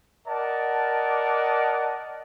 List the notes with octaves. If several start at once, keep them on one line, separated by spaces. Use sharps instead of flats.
A#4 D5 D#5 F#5 A5